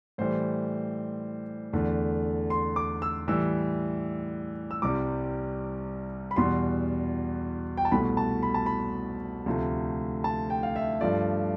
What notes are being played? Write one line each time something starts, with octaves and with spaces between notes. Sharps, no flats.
A2 E3 G3 C5
E2 D3 A3
C6
D6
E6
A2 E3 G3 E6
E6
C2 C3 G3 D6
B5
E2 B2 G3 C6
G5
A5
C2 B2 A3 B5
A5
B5
A5
B5
D2 C3 F3 A3
A5
G5
F5
E5
G2 F3 A3 D5